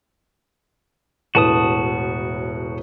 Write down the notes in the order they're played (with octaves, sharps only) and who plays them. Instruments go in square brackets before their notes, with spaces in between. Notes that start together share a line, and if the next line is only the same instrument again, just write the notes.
[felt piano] E1 A2 B4 [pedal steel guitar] F#4 A5 D#6